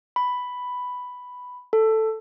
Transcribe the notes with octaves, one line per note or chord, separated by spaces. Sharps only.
B5
A4